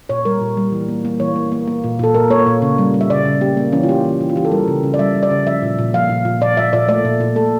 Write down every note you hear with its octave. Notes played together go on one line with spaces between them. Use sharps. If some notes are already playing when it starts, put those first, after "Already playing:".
A#2 C#5
G3 A#4
A#2
G3
E3
A#3
A#3
E3 C#5
A#3
A#3
A#3
A#2
A#2 A4
A#2 A#4
A#3 C#5
A#2
C#3
G3
G3
E5
C#3 D5
C#3
A#3 G4
A#3
E3 C#4
F4
A#3 G4
E3
E3
F4
E3 G4
A4
G3 A#4
C#3
C#3
D5
G3 E5
G3
D5
C#3
F3 E5
A#2
A#2
F3 F5
A#2
A#2
A#2 D5
A#2 E5
A#2 D5
A3 D5
A#2
A#2
A3 A4